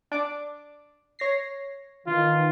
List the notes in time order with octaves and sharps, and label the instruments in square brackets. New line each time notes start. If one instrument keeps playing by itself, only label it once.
[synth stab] D4 D6
C#5 A#6 C7
[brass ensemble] D#3 E3 [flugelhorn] F4